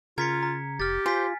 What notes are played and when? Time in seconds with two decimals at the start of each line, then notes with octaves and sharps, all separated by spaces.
0.18 C#3 F4 A#4 G#6 B6 C#7
0.43 A#5
0.80 F1 G4 F6 A6
1.06 F4 C5 G#5 B6